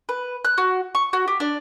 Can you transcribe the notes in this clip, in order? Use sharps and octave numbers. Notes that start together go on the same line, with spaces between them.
B4
F#6
F#4
C#6
F#4
G4
D4